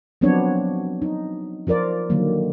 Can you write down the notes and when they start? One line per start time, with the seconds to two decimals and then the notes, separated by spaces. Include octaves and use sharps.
0.21 F3 F#3 B3 C4 D4 C#5
1.02 D#4
1.67 F3 F4 A#4 D5
2.10 D3 D#3 F#3 A#3